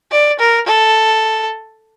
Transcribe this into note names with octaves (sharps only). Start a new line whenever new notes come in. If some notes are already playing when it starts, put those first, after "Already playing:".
D5
A#4
A4